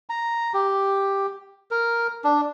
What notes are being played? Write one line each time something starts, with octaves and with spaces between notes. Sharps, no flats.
A#5
G4
A#4
D4